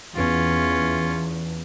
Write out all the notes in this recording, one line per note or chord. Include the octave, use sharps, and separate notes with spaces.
E2 C#4 F4